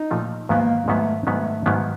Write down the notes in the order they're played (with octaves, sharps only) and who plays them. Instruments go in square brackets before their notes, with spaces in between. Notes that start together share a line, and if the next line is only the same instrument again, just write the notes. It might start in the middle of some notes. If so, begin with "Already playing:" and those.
Already playing: [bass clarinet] D#4
[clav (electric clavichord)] A#2 F3 A3
[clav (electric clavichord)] G#2 D#3 F#3 B3 [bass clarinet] A#3
[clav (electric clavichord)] G#2 D#3 F#3 B3 [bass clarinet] A3
[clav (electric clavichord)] G#2 D#3 F#3 B3 [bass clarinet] A3
[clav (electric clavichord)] G#2 D#3 F#3 B3